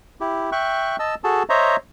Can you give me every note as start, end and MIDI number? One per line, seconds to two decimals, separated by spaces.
0.21 0.50 64
0.21 0.50 67
0.52 0.96 76
0.52 0.96 79
0.52 0.96 85
0.52 0.96 90
0.99 1.15 75
0.99 1.15 81
0.99 1.15 88
1.24 1.43 66
1.24 1.43 68
1.24 1.43 69
1.24 1.43 81
1.49 1.76 72
1.49 1.76 73
1.49 1.76 75
1.49 1.76 76
1.49 1.76 82